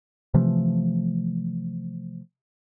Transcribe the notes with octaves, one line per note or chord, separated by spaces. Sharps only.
C3 E3 F3 A3